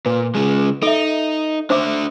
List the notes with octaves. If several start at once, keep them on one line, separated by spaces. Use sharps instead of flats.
A#2 B4
C#3 G#3
D#4 A4 E5
D4 C5 E5 D6